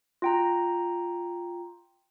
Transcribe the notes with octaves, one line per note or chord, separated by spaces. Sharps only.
F4 G5 A#5